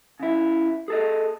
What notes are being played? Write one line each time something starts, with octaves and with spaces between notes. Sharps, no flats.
C#3 E4
G#4 A4 D#5